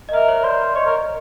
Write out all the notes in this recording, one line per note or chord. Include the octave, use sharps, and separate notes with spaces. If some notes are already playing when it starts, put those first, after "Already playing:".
D#5
A#4 E5
C#5
C5 D5
C#5 D#5
A#4